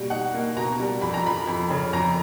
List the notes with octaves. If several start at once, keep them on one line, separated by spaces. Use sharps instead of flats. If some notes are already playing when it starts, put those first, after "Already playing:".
Already playing: B2 G3 A#3
D#4 F#5
A#3
B2 A#5
G3
F2 B5
A#5
F3 B5
F2
C#3
F2 A#5